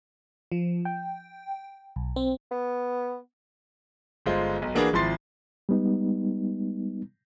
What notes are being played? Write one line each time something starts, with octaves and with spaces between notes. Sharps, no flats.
F3
G5
B1
C4
B3
G1 G#3 F4 C5
B1
E3 A#3 D4 F#4 G#4 B4
G#1 F3 E4 C6 A6 C7
G3 G#3 B3 D#4